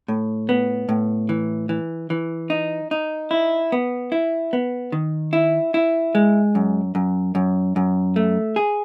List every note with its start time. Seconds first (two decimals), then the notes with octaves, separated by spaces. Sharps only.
0.08 A2
0.49 B3
0.89 A2
1.29 E3
1.69 E3
2.10 E3
2.50 D#4
2.91 D#4
3.31 E4
3.72 B3
4.12 E4
4.53 B3
4.92 D#3
5.33 E4
5.74 E4
6.15 G#3
6.55 F#2
6.95 F#2
7.35 F#2
7.76 F#2
8.16 A3
8.56 G#4